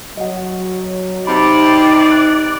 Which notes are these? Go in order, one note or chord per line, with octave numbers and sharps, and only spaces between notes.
F#3 D#5 F#5
C3 D#4 D5 B5
F#6